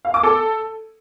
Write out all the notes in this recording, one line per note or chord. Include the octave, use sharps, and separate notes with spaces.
F5
D6
A4